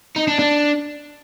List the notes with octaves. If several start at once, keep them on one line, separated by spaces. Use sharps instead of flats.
D#4
D4
D4